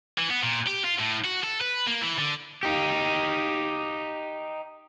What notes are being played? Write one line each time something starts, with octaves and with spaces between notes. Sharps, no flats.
E3
B3
A#2
G4
F4
A2
F#4
A4
B4
A#3
E3
D3
D#4 G4